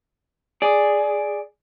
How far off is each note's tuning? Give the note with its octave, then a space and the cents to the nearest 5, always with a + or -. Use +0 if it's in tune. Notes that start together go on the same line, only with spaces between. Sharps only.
G#4 +0 D5 +0